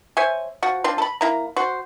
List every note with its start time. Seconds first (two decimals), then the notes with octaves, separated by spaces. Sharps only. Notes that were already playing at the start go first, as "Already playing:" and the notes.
0.17 C5 C#5 E5 G#5
0.63 F3 F#4
0.84 C4 D4 F4
0.98 A4 B5
1.21 A#3 E4 A#5
1.56 F#4 C5